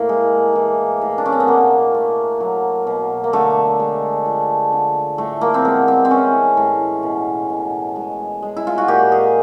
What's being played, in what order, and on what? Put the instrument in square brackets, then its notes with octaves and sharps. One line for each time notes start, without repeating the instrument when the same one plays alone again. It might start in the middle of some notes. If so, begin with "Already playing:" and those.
Already playing: [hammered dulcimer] A2 A#3
G#3
E3
A2
D4
C#4
C4
B3
B2 A#3
A3
F#3
B2
A#3
D3 A3
G#3
F3
D3
A2 A3
A#3
C4
G#3 B3
C4
C4
E3 C#4
A2
B2
B2
G#3
G#3
E4
F4
F#4
A#2 G4
G#4